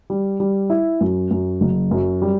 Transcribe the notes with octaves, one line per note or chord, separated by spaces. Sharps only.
G3
G3
E4
F#2
F#2
F#1
F#2
G3